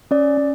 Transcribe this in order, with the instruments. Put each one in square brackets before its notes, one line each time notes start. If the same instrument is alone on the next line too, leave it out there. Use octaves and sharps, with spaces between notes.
[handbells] C#4 D5
C#4